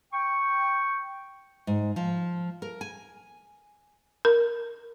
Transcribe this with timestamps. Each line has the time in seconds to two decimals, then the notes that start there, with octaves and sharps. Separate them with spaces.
0.13 G5 C#6
1.67 G#2
1.96 F3
2.62 A#4
2.81 G#5
4.25 A#4